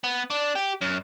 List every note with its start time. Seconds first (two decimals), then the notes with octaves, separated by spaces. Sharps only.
0.04 B3
0.30 D4
0.56 G4
0.82 F#2